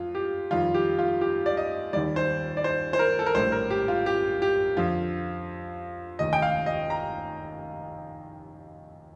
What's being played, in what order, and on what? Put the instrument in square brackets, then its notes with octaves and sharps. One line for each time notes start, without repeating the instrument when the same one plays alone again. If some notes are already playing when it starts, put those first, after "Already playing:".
Already playing: [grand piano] F2 F4
G4
F2 D#3 G3 F4
G4
F4
G4
D5
D#5
D#2 D#3 G3 D5
C5
D5
C5
C5
A#4
A4
A#4
A#1 A2 G3 C5
A#4
G4
F4
G4
G4
F2 D3 F3 F4
F1 D#2 D#3 D#5
G5
F5
D#5
A#5